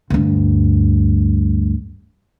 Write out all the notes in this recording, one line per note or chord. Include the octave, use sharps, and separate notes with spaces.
D2 G2